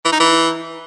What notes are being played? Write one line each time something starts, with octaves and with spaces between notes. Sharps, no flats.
E3
D#4
E3